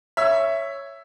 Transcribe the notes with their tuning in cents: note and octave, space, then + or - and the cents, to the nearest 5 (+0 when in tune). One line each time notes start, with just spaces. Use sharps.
C#5 +0 E5 +5